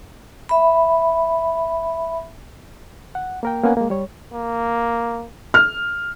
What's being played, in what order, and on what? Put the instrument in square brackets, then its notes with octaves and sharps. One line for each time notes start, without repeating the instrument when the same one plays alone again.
[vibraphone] E5 B5
[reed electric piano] F#5
A#3 A#4 G5
A#3 B3 C#4 F#5 G#5
G#3 A#3
G3 C#5
[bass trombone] A#3
[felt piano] F6